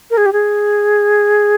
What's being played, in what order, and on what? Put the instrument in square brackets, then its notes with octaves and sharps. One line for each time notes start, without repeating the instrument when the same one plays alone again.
[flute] A#4
G#4
G4
G#4